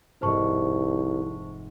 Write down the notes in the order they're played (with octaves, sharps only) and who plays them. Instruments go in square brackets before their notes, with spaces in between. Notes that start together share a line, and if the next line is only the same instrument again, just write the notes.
[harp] F1 G#2 [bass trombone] C2 [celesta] C5 A5 C#6